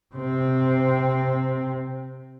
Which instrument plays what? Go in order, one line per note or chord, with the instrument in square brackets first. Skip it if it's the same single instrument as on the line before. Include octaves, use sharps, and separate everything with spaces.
[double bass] C3 C4